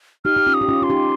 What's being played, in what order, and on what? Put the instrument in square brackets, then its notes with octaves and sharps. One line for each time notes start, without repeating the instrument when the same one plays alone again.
[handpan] D#4 G4 [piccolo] F6
[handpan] G4
C#4 F4
[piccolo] D#6
[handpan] G4
C#4 F4
[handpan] F4 [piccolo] C6
[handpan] D#4 G4